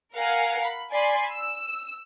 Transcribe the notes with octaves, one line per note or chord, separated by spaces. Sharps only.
A#4 F5 F#5 G#5
B5
D5 G#5 B5 C6
E6